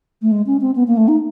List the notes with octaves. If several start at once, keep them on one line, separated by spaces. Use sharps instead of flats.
A3
G#3
C#4
C4
B3
A#3
A3
D#4